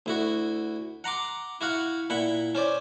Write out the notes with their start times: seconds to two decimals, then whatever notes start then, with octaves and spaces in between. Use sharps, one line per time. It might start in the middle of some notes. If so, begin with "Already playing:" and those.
0.06 D2 E4 F#4
1.04 F#5 A#5 C6 D6
1.61 E4 F#4 F5 F#5
2.10 A#2 E4 F#5 B5
2.55 C#4 C5 D5